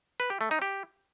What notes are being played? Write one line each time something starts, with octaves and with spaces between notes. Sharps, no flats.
B4
G4
A3
D#4
G4